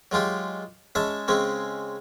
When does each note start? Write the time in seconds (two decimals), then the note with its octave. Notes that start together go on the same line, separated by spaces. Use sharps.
0.12 F#3 G#3 F4 G4
0.95 G#3 C#4 E5 A5
1.28 C#3 G#3 C4 C#4